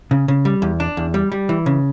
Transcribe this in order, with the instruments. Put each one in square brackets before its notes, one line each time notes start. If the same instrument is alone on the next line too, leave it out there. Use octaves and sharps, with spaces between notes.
[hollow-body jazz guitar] C#3
C#3
G3
E2
D4
E2
G3
G3
E3
C#3